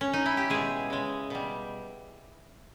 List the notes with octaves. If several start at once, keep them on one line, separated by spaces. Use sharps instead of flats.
C#4
D#4
E4
G4
B2 G#3 G#4
C#3 G#3
B2 G3